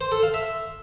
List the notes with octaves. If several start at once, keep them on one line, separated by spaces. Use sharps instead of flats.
C5
A4
F5
E5